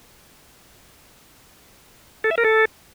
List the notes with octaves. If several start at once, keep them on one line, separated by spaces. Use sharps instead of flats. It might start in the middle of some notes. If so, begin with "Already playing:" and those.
A4
E5
A#4
A4